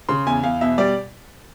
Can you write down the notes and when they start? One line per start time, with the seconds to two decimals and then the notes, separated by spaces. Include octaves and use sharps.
0.09 C#3 C6
0.26 E2 G#5
0.43 E2 F5
0.61 B2 E5
0.78 G3 D5